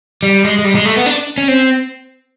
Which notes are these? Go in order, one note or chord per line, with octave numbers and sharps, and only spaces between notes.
G3
G#3
G#3
G3
G#3
A3
B3
D4
C#4
C4